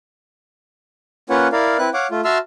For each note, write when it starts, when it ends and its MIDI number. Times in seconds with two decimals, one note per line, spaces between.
1.30 1.48 58
1.30 1.48 61
1.30 1.48 65
1.30 1.48 71
1.30 1.48 73
1.30 1.48 78
1.52 1.77 64
1.52 1.77 70
1.52 1.77 74
1.52 1.77 77
1.79 1.90 60
1.79 1.90 64
1.79 1.90 71
1.79 1.90 90
1.94 2.07 73
1.94 2.07 77
1.94 2.07 78
1.94 2.07 86
2.11 2.21 57
2.11 2.21 65
2.25 2.38 66
2.25 2.38 76
2.25 2.38 81
2.25 2.38 84
2.25 2.38 88
2.25 2.38 89